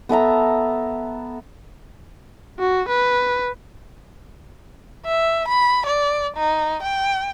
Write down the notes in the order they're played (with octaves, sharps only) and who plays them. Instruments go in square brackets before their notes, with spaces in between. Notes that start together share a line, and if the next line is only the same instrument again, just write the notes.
[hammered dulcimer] B3 A4 E5 A#5
[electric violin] F#4
B4
[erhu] E5
B5
D5
D#4
G5